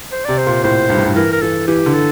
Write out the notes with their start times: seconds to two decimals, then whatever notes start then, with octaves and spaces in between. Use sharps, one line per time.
0.12 C5
0.25 C3 D5
0.38 C5
0.47 A#2
0.64 A2 C5
0.90 G2
0.97 A2
1.05 G2
1.16 E3 A#4
1.33 A#4
1.42 E3 A4
1.68 E3 G4
1.86 D3
1.94 A4